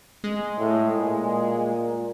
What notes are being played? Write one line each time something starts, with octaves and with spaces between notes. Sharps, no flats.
G#3
A2
A#2